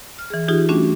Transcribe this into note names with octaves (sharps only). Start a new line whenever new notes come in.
F6
E3 G#4
E3 D#4 F4 G4 G#4
G3 A3 C#4 D4 F#4